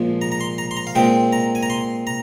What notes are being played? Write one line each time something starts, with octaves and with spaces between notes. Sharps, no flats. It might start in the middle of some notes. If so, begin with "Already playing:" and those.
Already playing: A#1 A#2 F3 G#3
A#5
A#5
C6
A#5
C6
A#5
F5
A#2 G#3 C4 G5
A#5
G#5
A#5
C6
A#5